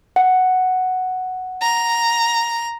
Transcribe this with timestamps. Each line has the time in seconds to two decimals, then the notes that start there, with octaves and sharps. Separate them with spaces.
0.16 F#5
1.62 A#5